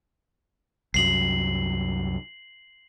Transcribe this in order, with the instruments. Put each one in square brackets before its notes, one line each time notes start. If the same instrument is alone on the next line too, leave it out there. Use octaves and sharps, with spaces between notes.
[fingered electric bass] C2 F#2 F#3 [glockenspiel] C7 F#7